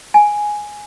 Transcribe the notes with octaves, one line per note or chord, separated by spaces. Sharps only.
G#5